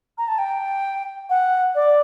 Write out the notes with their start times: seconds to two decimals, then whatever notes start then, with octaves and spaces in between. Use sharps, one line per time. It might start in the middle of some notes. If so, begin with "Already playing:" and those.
0.18 A#5
0.28 A5
0.38 G5
1.30 F#5
1.75 D5